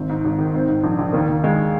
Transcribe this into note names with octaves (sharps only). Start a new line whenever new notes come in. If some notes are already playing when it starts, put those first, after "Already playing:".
Already playing: G#1 C4
G#2
G#1
D#3
G#2 C4
G#2
A#1
A#1
D#2 A#3
D#2
D#2 G#3